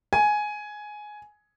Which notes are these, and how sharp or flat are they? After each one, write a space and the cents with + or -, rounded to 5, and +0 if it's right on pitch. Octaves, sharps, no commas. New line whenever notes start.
G#5 +10